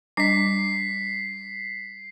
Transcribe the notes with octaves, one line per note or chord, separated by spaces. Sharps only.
G3 D4 D#5 B6 C7